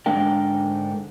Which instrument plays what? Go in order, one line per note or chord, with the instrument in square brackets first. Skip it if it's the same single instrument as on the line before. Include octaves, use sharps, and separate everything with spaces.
[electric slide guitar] G#2 D3 G#3 D4 A#4 G5